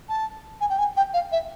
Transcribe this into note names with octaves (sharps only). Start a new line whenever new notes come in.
A5
G#5
G5
G#5
G5
F5
E5